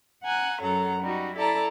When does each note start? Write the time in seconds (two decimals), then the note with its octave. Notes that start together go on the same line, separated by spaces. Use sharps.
0.23 F#5 G#5 A#5 F#6
0.60 F#2 F#3 A4 F#5 A#5
1.02 G3 D#4 F#4
1.36 E4 A4 D5 A5 A#5